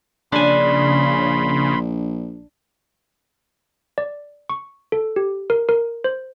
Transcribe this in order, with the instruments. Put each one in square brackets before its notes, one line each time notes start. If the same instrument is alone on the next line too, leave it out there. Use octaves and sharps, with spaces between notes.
[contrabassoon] A#1 [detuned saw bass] C#3 [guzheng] D4 G#5 [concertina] B5 C6
[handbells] D5
C#6
A4
G4
A#4
A#4
C5